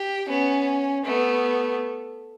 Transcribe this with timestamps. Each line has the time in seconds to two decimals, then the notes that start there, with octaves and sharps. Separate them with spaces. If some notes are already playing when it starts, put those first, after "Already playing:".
Already playing: G4
0.29 B3 C#4
1.06 A3 B3